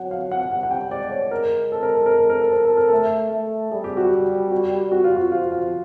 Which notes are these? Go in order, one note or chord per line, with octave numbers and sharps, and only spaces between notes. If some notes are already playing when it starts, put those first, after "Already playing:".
Already playing: F#3 F#5
F5
F#5
G3 F#5
F#5
G5
G#3 D5
C#5
A#4
A4
A#4
A4
A#4
A4
A#4
A4
A#4
A4
A#4
A3 A4
A3
G3 G#4
G4
F#4
G4
F#4
F#4
F4
F#4
F3 F4
F4